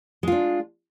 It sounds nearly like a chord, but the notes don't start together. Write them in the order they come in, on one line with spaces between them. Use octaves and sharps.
G#3 F4 D4